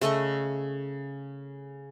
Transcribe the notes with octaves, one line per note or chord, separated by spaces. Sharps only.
C#3 A3 D#5 C#6